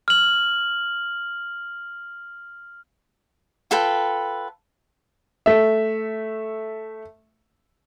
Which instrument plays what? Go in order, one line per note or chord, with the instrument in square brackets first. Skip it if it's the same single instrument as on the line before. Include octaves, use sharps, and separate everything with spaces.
[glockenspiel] F6 F#7
[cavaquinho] F4 A4 B4 G5
[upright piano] A3 E5